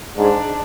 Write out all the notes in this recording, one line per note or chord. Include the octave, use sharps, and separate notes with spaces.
G#2 D4